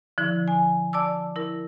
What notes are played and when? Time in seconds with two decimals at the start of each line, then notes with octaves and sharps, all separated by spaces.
0.18 D3 F3 E4
0.48 G#5
0.93 D5 A5 D6 E6
1.36 E4 A#4